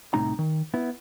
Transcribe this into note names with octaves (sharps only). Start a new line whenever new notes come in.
C2 A2 C3 D#4 A#5
D#3
B3 E4